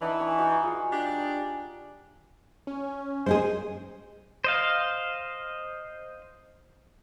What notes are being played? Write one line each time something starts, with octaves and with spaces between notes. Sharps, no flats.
E3 D4 D#4 F#5
G#5 A#5 C#6
D#4 F#4
F4 G#4 F#5
D4 G4
C#4
G#3 D#4 G#4 C5
C5 D#5 F5